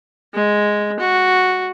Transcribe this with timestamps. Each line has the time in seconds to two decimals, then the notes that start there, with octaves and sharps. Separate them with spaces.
0.34 G#3
1.00 F#4